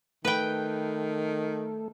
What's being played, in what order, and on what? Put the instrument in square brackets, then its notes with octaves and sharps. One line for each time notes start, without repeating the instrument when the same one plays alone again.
[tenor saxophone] D#3 [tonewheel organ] A3 [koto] B4 G5